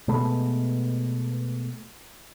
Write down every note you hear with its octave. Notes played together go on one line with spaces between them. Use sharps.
B2 G#3 A3 B3